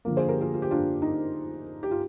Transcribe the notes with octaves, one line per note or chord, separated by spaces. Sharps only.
D3 F3 A#3
G#4 C5
G4 A#4
F4 G#4
F4
G4
D4 F4
D#4
G4
F4